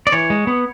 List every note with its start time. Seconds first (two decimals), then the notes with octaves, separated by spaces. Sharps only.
0.07 D5
0.12 E3 C#5
0.30 G#3
0.47 B3